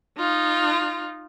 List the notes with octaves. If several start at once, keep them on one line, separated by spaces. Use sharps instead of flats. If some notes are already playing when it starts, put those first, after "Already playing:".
D#4 F4